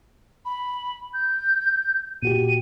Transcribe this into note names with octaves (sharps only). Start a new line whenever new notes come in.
B5
G6
A#2 F#4 G4 D#7